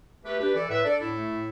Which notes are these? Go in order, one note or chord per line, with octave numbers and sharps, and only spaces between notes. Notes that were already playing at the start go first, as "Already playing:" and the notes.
A3 G4 B4
D4 G4 B4
E3 A4 D5
A2 B4 E5
D4 A4 D5
A2 E4 A4
A3
A2